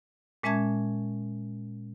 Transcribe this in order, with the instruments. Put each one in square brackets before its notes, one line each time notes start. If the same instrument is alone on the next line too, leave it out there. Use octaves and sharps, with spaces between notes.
[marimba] A#2 G#3 C#4 E5 A5 G#6